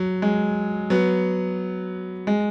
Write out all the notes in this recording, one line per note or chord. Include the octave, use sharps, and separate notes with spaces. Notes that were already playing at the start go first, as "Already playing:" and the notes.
Already playing: F#3
G#3
F#3 B3
G#3